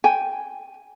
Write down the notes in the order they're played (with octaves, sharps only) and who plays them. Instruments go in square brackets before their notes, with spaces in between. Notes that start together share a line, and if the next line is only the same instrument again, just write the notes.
[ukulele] G5 G#5